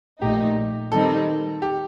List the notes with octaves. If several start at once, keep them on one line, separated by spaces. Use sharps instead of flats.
A#1 A#2 A3 D#4 G4
D#3 G3 C4 D#4 A4
G4